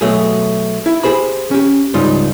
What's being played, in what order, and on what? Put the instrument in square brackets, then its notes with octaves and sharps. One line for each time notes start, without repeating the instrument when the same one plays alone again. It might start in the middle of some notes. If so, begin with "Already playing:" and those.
[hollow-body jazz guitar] B2 F#3 A3 G#4
E4
G4 G#4 C5 B5
C#4 G4
C#2 G#2 G3 D#4 F4